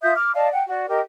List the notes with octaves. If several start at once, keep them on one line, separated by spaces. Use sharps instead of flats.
F4 E5 D#6 G6
D6 F6
D5 D#5 F5 A5
F#5 G5
F#4 D5
G4 A#4 D#5